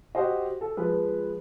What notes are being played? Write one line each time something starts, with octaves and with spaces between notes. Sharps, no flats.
F#4 G4 C5 D#5
A4
F3 G#3 B4